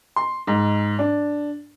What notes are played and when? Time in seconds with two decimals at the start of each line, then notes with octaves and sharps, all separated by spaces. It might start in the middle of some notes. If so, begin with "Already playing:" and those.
0.16 C6
0.47 G#2
0.99 D4